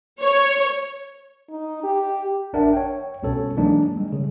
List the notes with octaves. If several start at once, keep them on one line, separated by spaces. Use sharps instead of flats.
C#5
D#4
G4
A1 D4 A#4 E5 F#5 A5
C#5 G5
C2 B2 C#4 A4 C#5
E3 F#3 G#3 A#3 D4 D#4
G3 G#3
C#3